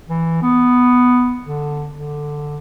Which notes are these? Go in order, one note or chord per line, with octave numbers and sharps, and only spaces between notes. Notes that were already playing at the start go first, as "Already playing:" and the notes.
E3
B3
D3
D3